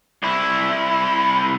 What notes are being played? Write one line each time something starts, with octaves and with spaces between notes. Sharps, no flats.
C2 E4